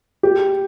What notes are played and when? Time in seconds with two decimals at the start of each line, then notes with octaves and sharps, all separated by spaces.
0.23 G4